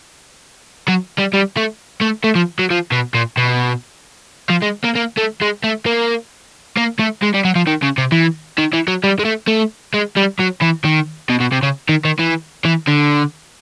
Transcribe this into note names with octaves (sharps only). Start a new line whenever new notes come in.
F#3
G3
G3
A3
A3
A3
F3
F#3
F3
B2
A#2
B2
F3
G#3
A#3
A#3
A3
G#3
A3
A#3
A#3
A3
G#3
G3
F#3
F3
D#3
C#3
C3
E3
D#3
E3
F#3
G3
G#3
A3
A3
G#3
G3
F#3
E3
D#3
B2
B2
C3
C#3
D#3
D#3
E3
E3
D3